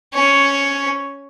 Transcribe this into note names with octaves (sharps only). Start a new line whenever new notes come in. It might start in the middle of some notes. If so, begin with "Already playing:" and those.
C#4 C#5